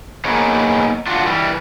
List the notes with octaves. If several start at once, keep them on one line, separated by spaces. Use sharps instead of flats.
A#3 B3 D#4 G#4 A#4 C#5
D4 F4 F#4
E3 G3